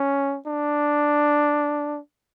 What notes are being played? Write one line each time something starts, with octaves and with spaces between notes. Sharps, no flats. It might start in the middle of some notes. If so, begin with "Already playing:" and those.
Already playing: C#4
D4